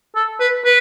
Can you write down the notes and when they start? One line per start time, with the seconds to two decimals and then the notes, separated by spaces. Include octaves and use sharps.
0.16 A4
0.40 B4
0.65 B4